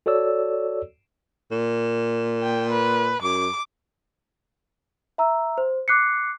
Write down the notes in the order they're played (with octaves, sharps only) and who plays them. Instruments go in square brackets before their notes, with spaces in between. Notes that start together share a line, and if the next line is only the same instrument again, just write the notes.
[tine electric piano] F#4 A4 C#5 D5 E6
[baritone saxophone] A#2
[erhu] G5
B4
[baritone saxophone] F#2 [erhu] D6
[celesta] E5 A#5 E6
C5
D6 F#6 C7 C#7